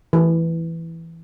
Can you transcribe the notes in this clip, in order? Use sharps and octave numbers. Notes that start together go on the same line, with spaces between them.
E3